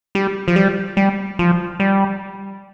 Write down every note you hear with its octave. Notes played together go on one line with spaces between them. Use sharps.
G3
F3
G3
G3
F3
G3